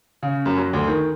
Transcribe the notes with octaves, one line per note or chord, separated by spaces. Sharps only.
C#3
F#2
F#3
D2
D#3